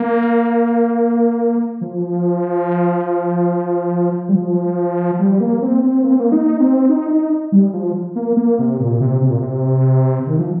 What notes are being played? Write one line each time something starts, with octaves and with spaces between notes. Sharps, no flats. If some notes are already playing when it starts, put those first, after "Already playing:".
Already playing: A#3
F3
G3
F3
G3
A#3
C4
C4
A#3
C4
A#3
D#4
C4
D#4
D#4
G3
F3
A#3
A#3
C3
A#2
C3
C3
A#2
C3
D#3
F3